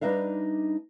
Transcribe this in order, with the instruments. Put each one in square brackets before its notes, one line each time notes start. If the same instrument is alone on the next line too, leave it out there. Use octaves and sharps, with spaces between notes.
[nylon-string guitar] G3 D4 D#4 B4 E5 F5